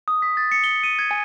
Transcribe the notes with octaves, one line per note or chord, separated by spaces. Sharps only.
D#6
B6
A6
C#7
G7
D#7
G#6
G#5